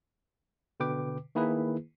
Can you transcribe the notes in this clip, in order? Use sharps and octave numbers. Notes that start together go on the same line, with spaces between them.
B2 D3 B4 G5 D6
D#3 A#3 E4 G#4 B4